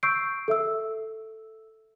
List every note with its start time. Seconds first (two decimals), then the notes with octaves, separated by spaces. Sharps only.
0.03 C#6 E6 G6 C7 D7
0.48 A4 E5 E6